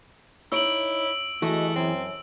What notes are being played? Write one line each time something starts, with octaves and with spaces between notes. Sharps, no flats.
D#4 E4 C#5 E6 D7 F#7
E3 A3 F#4 G#4 D#5
F#2 C4